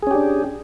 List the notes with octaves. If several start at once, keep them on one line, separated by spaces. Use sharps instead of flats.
C#4 D4 G4 G#4